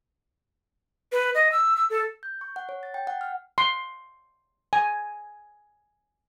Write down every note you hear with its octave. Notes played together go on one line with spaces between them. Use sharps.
B4
D#5
E6
E6
A4
G6
C#6
F#5
C#5
A6
G5
F#5
F6
C6
G#5